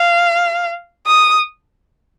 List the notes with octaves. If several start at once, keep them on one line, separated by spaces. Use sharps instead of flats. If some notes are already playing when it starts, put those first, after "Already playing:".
Already playing: F5
D#6